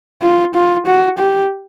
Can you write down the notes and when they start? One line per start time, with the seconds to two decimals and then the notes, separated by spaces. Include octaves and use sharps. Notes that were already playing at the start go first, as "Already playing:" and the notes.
0.23 F4
0.55 F4
0.86 F#4
1.19 G4